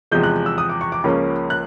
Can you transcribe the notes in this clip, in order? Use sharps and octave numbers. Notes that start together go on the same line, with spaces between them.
E2 C3 F3 G#3 G6
F#6
E6
D#6
D6
C#6
D6
C#2 C#3 F3 A#3 C#4
F#6